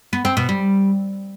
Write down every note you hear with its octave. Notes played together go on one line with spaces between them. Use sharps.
B3
C4
B2
G3